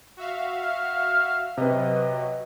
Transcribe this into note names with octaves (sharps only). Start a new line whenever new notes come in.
F#4 E5 F5
F6
C3 F#3 B4 D#5